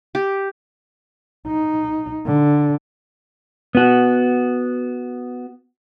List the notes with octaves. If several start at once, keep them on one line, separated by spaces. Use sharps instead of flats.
G4
D#4
D3
B3 F#4